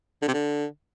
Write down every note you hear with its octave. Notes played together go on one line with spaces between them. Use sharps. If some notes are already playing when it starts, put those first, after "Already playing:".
D3
C3
D3